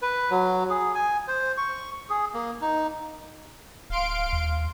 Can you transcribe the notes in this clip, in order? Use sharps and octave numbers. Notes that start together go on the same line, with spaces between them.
B4
F#3
G#4
G#5
C5
C#6
G#4
A#3
D#4
D1 F5 C6 D7
D#2